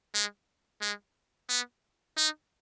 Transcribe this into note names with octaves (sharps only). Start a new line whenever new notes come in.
G#3
G#3
B3
D#4